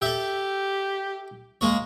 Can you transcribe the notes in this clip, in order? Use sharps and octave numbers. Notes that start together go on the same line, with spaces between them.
G4 A4 E5
G#3 A#3 C#5